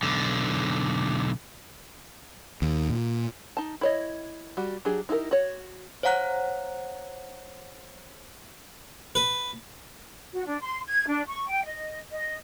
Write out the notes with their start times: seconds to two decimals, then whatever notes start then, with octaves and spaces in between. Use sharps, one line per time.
0.03 B1 D3
2.62 D#2
2.90 A#2
3.57 D#4 A5
3.81 E4 C#5 D#5
4.57 G3 F#4
4.85 F#3 D4 G4 G#4
5.09 D#4 E4 G4 G#4 A#4
5.31 F#4 C#5
6.03 C5 C#5 F5 F#5 A#5 F#6
9.15 B4
10.34 F#4
10.47 D4
10.62 C6
10.86 G#6
11.08 D4
11.27 C#6
11.48 G5
11.65 D#5
12.11 D#5